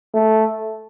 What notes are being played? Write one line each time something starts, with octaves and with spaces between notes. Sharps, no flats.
A3